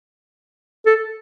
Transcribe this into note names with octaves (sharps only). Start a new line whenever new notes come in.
A4